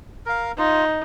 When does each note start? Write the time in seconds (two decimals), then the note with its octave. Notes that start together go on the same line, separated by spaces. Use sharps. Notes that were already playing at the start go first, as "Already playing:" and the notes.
0.26 A#4 F5
0.58 D#4 F4